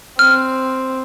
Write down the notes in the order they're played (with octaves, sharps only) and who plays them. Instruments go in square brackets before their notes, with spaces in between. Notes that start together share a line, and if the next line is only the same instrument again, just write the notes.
[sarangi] C4 [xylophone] F6